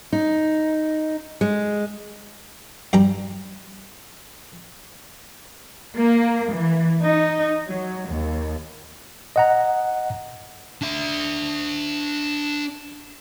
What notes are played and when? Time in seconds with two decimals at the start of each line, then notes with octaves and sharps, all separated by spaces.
0.13 D#4
1.41 G#3
2.93 G2 G3 A#5
5.96 A#3
6.52 E3
7.04 D#4
7.66 F#3
8.07 D#2
9.36 D#5 F#5 A#5
10.82 D4 E5